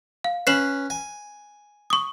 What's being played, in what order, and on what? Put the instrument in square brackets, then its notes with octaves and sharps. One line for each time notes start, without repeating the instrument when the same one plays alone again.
[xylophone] F5
[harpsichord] C#4 B4 [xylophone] C7 E7 F#7
[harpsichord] G#5
[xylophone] C#6 D#6